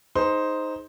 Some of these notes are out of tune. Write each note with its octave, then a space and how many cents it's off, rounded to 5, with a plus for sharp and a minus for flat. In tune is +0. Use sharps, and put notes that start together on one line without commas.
D#4 +5 G#4 +35 C5 +0